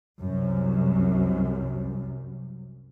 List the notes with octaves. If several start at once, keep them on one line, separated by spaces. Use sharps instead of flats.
C2 F#2 C3